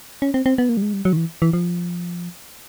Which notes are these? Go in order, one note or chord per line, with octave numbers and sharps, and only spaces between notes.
C#4
C4
C4
B3
A#3
G3
G#3
G3
F#3
D#3
E3
E3
F3